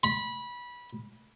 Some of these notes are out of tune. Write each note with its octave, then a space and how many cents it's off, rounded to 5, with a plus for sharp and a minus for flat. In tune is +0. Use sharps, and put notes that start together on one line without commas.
B5 -20